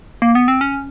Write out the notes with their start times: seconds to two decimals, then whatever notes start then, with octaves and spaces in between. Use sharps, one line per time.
0.22 A#3
0.35 B3
0.48 C4
0.61 C#4